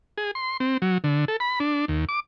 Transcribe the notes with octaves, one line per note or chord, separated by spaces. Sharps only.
G#4
C6
C4
F#3
D3
A4
B5
D4
D#2
D6